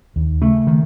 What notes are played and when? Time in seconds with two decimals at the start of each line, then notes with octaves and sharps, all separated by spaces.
0.16 D#2
0.41 C#3 A3
0.67 D#3